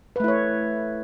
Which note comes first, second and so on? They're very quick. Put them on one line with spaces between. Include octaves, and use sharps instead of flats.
B4 A3 E4 C#5